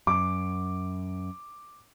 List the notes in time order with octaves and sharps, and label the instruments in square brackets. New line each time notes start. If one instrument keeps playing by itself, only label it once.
[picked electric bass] F#2 [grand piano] D6